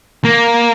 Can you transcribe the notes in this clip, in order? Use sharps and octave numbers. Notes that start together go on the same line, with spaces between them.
A#3